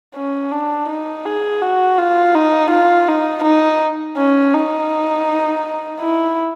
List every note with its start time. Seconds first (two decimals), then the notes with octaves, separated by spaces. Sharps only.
0.15 C#4
0.52 D4
0.89 D#4
1.25 G#4
1.62 F#4
1.99 F4
2.35 D#4
2.71 F4
3.08 D#4
3.44 D#4
4.17 C#4
4.54 D#4
6.01 E4